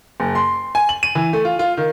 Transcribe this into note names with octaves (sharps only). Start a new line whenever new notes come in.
F#1
C6
G#5
F#7
D#7
E3
A3
F4
F4
D#3